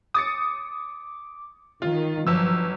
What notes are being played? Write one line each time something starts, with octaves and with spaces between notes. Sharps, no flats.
D6 D#6 A6 C#7
D#3 F4
G1 F3 F#3 E6